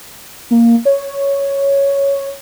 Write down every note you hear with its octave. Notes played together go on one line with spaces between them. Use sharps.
A#3
C#5